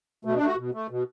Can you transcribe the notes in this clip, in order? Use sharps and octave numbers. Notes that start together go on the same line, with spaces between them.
B2 A3
D4
A3
F#4
B2
A3
B2